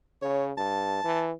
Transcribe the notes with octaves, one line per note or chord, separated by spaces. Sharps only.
C#3 C#5
G2 A5
E3